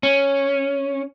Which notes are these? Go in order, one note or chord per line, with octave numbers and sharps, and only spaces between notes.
C#4